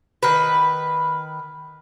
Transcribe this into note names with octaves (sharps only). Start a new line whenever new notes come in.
D#3 B4